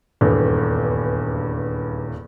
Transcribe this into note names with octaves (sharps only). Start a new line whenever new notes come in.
D#1 E2 G2